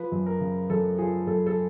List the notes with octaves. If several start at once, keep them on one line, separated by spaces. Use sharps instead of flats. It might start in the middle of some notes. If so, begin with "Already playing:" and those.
Already playing: F3 B4
F#2
A#4
C#3
F#2 A4
F3 G#4
F#2 A4
A4